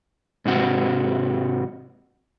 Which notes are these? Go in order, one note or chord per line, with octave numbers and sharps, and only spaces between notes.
G#2 C3 F#4